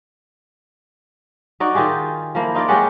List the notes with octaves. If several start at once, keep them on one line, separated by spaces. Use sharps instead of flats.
D#4 F#4 D5
D#3 F4 G4 G#4
F3 A#3 E4
D#4 F4 A#4 D5
G#3 C#4 G4 F#5